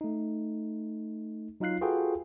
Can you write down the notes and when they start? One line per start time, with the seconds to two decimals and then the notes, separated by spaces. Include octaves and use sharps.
0.01 A3 D#4
1.60 F#3 D#4 F4 F5 F#6 C7
1.81 F4 F#4 G#4 A4 B4 G5